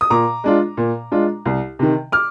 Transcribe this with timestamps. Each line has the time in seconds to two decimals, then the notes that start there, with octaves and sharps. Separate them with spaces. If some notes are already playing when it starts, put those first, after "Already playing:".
0.01 D#6
0.10 A#2 A#5 D6
0.44 G#3 D4 F4
0.77 A#2
1.12 G#3 D4 F4
1.46 C2
1.79 C3 D#3
2.12 D6 F6